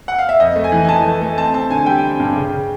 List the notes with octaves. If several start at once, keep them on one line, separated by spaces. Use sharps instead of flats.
F#5
F5
E5
F2 D#5
A3
G#5
E3
G#5
E3 A5
A3
A3
C4 A5
C4 A5
D3 G#5
G3 G5
C4
G2
C#3
C#3